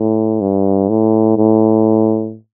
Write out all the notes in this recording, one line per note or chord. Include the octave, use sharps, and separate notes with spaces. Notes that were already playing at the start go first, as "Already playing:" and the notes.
Already playing: A2
G2
A2
A2